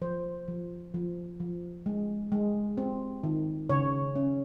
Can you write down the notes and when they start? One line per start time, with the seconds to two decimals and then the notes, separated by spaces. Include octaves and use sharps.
0.02 F3 C5
0.48 F3
0.94 F3
1.40 F3
1.86 G#3
2.32 G#3
2.78 C4
3.23 D#3
3.69 C#3 C#5
4.16 C#4